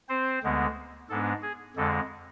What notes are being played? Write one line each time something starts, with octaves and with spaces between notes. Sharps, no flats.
C4 C5
D2 D3 G#3 B3
G#2 G#3 B3 D4 A4
G#4
F2 D3 G#3 A4